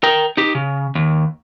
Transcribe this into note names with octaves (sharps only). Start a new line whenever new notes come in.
A#4 G5
D#4 G4
C#3
D#2